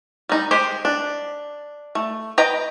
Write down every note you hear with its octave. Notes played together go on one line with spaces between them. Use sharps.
G3 D#4
G#3 G4 G#4 C5
D4
A3
B4 D#5 G5 A#5